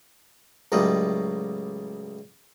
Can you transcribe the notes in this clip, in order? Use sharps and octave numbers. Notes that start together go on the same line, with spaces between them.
C#2 A2 F#3 G3 D#5